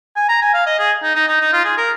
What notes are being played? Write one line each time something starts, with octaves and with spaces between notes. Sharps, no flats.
G#5
A#5
G#5
F5
D#5
G#4
D#4
D#4
D#4
D#4
F4
G#4
A#4